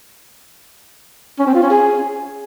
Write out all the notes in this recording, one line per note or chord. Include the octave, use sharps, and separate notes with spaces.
C#4
C4
F4
C#4
G#4